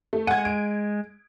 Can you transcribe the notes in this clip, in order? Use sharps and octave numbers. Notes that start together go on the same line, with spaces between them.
A3
G#3 F#5 G#5 G#6
D7